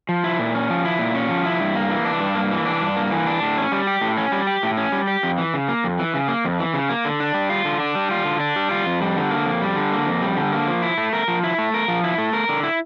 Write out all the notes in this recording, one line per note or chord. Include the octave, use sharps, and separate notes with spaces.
F3
E4
A#2
C#4
F3
E4
A#2
C#4
F3
E4
G2
A#3
E3
D4
G2
A#3
E3
D4
G2
A#3
E3
D4
A2
C#4
G3
G4
A2
C#4
G3
G4
A2
C#4
G3
G4
F2
E3
C#3
A#3
F2
E3
C#3
A#3
F2
E3
C#3
A#3
D3
D4
G3
F4
D3
D4
G3
F4
D3
D4
G3
F4
F2
G3
D3
A#3
F2
G3
D3
A#3
F2
G3
D3
A#3
F3
E4
A3
A#4
F3
E4
A3
A#4
F3
E4
A3
A#4
D3
E4